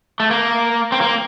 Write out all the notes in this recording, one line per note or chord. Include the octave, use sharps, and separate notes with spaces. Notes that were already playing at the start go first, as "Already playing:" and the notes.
A3
A#3
C4
A#3